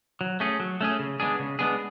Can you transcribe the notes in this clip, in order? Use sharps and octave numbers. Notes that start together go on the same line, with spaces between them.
F#3
A3 C#4 G#4
F#3
A3 C#4 G#4
C#3
G#3 B3 D4 G#4
C#3
G#3 B3 D4 G#4